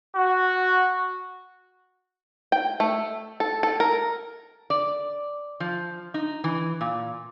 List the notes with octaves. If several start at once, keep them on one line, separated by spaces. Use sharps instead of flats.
F#4
G5
A3
A4
A4
A#4
D5
F3
D#4
E3
A#2